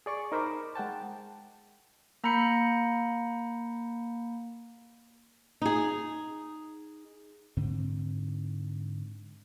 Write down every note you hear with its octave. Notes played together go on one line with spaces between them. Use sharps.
G#4 D5 C#6
D#4 A#4 C5 B5 D6
G#3 F#5 G5 A5
A#3 A#5 B5 G6 C#7
D#4 G#4
G#2 D3 C4